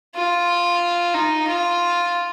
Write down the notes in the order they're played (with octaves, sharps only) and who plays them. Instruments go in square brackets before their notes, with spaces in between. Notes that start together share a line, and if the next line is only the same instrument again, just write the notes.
[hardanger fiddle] F4
D#4
F4